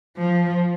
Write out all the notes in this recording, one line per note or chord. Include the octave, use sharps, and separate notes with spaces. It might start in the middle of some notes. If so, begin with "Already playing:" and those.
F3